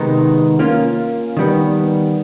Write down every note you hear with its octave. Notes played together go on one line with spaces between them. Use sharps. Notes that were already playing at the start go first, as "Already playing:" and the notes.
Already playing: C3 D#3 G#3 B3 D#4
A#3 C#4 F4
D#3 G3 B3